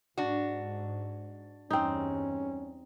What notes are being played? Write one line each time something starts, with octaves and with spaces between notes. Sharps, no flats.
G#2 D4 F#4
E2 G2 C4 C#4 D#4